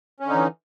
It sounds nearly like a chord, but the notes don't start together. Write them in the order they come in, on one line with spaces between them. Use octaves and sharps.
C#4 D3 D#4 E3